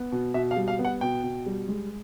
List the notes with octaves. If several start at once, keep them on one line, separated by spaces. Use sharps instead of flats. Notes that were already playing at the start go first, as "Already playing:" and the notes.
Already playing: B3
B2
B2 E5
F5
G3
F5
B3
F#5
B2 G5
B2
G3
G#3